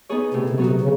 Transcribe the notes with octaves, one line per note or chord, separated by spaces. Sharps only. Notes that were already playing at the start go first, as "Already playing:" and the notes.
B3 D#4 G#4 C#5
A2 C3
C3
F#3 B3 D#4 F#4
C3
C#3